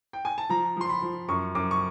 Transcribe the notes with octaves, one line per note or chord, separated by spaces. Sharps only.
G5
G#5
A5
F3 A#5
F3 C6
B5
F3
F#2 C#6
F#2 D6
C#6